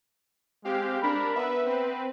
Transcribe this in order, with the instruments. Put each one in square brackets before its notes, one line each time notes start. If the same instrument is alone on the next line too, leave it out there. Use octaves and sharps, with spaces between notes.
[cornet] G#3 [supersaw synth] C4 G4 F5
[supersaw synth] D4 A#4 [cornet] B5
[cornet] B3 [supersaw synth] B4 E5
[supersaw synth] C4 B4